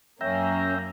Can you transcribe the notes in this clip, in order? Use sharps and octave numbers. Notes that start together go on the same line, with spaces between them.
F#2 A#3 C#4 E5 G5 A#5